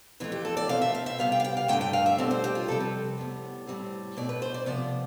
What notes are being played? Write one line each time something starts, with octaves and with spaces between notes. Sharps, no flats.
F2 E3 A3 F4
G4
A4
D5
B2 A3 C4 F5
E5
F5
E5
C3 G3 B3 F5
G5
F5
G5
F5
G2 D3 A3 G5
G5
F5
E5
B2 G3 C4 D5
C5
G4
F4
F2 C3 G3 C4 A4
B4
A2 G3 B3
A2 G3 C4
B2 A3 C4 D5
B4
C5
D5
C3 F3 B3 D5